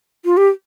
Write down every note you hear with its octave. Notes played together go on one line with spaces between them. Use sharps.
F4
G4